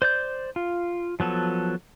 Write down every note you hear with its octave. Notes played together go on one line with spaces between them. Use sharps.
C5 D5 G6
F4
F3 F#3 B3 A4